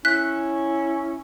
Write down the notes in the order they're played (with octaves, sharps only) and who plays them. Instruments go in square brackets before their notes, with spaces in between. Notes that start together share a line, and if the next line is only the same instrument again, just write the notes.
[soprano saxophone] C#4 [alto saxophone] E4 [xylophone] F#6 B6